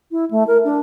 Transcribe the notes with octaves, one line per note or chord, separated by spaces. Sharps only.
E4
A3
A#4
D4